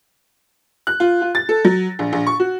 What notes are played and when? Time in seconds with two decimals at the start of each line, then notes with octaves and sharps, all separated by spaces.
0.87 F#6
1.00 F4
1.22 F4
1.35 A6
1.49 A4
1.65 F#3
1.99 A#1
2.13 A#1
2.27 C#6
2.40 F#4